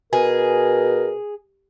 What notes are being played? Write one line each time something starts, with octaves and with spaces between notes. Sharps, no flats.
B2 G#4 A#4